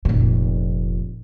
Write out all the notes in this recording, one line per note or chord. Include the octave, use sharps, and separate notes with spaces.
F1 A#2